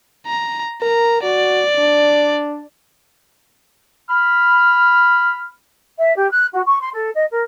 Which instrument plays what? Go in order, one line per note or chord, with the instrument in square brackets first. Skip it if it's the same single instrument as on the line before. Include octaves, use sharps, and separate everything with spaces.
[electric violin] A#5
[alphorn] A#4 [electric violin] A#5
[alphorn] F#4 [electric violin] D5
[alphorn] D4
[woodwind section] B5 F6
[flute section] E5
G4
F#6
F#4
C#6
C6
A4
D#5
A#4